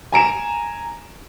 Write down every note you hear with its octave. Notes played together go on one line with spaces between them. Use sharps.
G#5 A#5 D7 E7